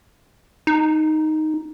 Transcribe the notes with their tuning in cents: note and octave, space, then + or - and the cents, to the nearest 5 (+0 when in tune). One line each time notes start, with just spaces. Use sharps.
D#4 +0